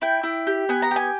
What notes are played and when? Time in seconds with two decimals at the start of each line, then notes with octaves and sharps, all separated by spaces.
0.02 E4 G5
0.23 E4
0.47 G4
0.69 B3 G#5
0.82 A#5
0.91 G4
0.96 G#5